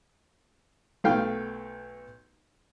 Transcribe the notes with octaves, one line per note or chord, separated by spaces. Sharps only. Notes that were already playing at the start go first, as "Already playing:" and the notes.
B1 A3 F5 G5